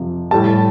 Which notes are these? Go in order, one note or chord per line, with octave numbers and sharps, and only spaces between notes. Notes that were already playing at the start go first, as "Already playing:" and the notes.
Already playing: F2 C3 F3
A2 G3 A5